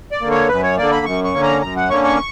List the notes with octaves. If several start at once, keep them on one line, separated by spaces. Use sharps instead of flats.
D5
D3 A#3
C#5
F#2 B4
C#5
D3 A#3 D5
B5
F#2 C#6
C#6
D3 A#3 C#4
A#5
F#2 A#5
F#5
D3 A#3 C#4 C#6
C#6